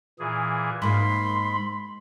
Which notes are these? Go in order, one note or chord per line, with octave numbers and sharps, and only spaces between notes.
A#2 E3 G#4
G#2 A#3 B5 C6